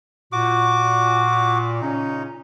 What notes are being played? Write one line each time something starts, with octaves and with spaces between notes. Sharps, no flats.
A#2 F#4 D6
A#2 C#3 C#4 D#4